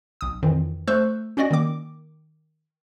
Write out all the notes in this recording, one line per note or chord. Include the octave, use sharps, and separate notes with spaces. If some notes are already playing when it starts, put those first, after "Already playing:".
B1 D#6
F2 D#3 E3
A3 C5 C#6 E6 F#6 G6
C#4 F#4 D5 D#5 A#6
D#3 A#3 D6